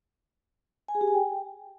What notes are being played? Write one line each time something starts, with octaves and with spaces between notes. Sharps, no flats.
G#5
G#4
G4
G#5
G5